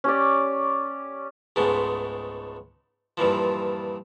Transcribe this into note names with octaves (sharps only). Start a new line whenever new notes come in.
C#4 G4 D5
C#2 G#2 G#3 A3 B3
G2 A#2 E3 F3